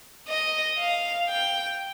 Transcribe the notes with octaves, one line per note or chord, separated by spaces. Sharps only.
D#5
F5
G5